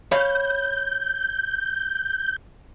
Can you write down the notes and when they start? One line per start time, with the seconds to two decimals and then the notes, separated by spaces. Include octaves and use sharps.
0.12 C#5 F5 B5 G6